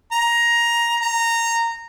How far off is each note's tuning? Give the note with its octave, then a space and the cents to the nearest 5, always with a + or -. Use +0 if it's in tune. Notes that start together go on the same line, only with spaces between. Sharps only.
A#5 +10
A#5 -15